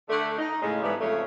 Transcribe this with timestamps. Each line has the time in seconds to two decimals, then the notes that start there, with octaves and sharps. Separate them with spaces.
0.09 D3 A3
0.39 D#4
0.62 A2 C#3 G#3
0.82 G#2 D3 E3 G3 B3
1.01 F2 C#3 A3 C#5